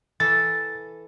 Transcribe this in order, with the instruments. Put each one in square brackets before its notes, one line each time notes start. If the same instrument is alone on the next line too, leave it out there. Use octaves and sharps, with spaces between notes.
[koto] E3 A4 [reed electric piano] A6